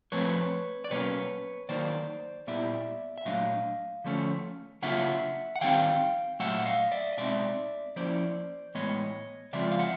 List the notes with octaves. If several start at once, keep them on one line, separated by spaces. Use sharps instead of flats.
F3 A3 C4 B4 C#5
D5
B2 F#3 A#3 C#4 B4 C#5
D#3 F#3 A#3 D#4 C5 D5
A#2 G3 B3 E4 D5 E5
E5
A#2 F#3 A3 D4 D#5 F5
D3 F3 A3 C#4
C#3 F#3 A#3 D4 F4 E5 F#5
F#5
D#3 G3 C4 D#4 F5 G5
A#2 F#3 A3 E5 F#5
D#5 F5
D5 E5
D#5
B2 G#3 C4 D#4 D5 E5
F3 A#3 C#4 E4 C5 D5
A2 E3 G#3 B3 C#5 D#5
C#3 F3 G#3 C4 F4 D5 E5
F5
E5 F#5